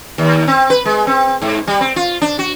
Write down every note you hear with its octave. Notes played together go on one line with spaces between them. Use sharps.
D#2
C4
B4
G#3
C4
G#2
G3
C4
F4
D4
F#4